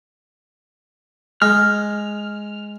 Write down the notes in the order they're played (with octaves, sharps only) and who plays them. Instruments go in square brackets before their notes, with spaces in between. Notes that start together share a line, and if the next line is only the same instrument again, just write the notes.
[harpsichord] G#3 [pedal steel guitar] F6